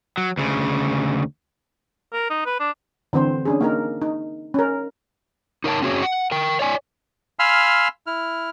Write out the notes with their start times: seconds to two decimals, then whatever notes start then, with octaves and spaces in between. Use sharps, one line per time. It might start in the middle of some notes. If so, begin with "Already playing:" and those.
0.18 F#3
0.37 D2 C#3
2.13 A#4
2.30 D#4
2.46 B4
2.60 D4
3.13 D3 E3 C4 C5
3.45 C#4 D4 G#4
3.61 A#3 D#4 A#4
4.01 D#4
4.54 C#4 A#4
5.64 D#4 A#4 C#5 G5 A5
5.82 C4 C#4 F#4 G#4 C#5
6.02 F#5
6.31 A#4 G5
6.59 C#5 D5 G#5
7.39 F5 G#5 B5 C6 E6 F6
8.07 E4 F6